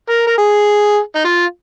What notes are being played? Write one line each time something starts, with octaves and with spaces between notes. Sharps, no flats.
A#4
A#4
G#4
D#4
F4